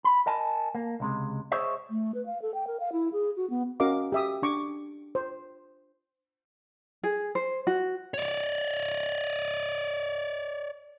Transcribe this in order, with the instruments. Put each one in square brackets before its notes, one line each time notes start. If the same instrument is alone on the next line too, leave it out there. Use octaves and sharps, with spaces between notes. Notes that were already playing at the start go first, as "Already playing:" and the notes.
[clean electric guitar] B5
A#4 D#5 G#5 A5
A#3
C#2 C3 G#3
G#4 C5 C#5 D#5 E5
[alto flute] A3
B4
F5
A4
G5
A#4
F5
E4
G#4
F#4
B3
[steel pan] C#4 F#4 A#4 D#5 F5 D6
G4 E5 D#6
D4 C#6 D6
C5
[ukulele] G#4
C5
F#4
[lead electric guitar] C#5 D5